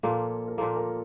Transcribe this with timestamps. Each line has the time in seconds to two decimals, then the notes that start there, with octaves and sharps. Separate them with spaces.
0.03 A#2 F3 A#3 A4
0.48 A#4
0.58 A#2 F3 A#3 A4
0.76 A#4